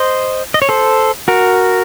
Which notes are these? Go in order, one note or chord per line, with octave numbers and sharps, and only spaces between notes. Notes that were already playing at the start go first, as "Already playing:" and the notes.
Already playing: C5 D#5
D#5
C#5
A4 C5
F#4 A#4